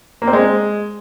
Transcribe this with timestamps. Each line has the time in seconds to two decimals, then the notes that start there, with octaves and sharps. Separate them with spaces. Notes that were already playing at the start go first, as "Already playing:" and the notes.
0.22 A#3
0.28 C4
0.33 G#3